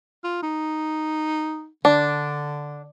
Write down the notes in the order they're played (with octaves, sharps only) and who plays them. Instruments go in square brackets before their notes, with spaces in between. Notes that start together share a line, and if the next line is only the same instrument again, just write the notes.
[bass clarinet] F4
D#4
[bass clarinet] D3 [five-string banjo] D4